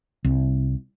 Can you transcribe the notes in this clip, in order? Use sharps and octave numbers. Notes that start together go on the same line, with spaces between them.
C2